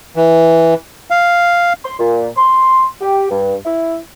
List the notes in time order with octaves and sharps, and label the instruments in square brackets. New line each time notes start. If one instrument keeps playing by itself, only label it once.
[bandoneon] E3
F5
[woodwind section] C6
A#2
C6
G4
G2
E4